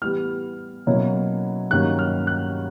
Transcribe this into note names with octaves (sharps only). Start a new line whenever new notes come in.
E3 G3 B3 F6
B2 F#3 A#3 C#4 E4
G2 D#3 F#3 A#3 C#4 F#6
F6
F#6